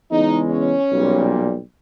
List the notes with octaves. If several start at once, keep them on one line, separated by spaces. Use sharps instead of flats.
E2 C#3 G#3 D#4
C#4
B1 A#2 G3